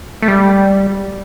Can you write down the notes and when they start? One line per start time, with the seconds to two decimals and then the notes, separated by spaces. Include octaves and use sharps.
0.22 A3
0.28 G3